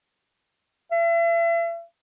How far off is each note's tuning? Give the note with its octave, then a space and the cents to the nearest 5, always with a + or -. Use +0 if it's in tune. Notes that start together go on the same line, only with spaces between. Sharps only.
E5 +40